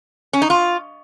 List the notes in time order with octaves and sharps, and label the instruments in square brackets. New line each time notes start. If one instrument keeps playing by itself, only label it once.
[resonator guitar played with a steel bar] C#4
D#4
F4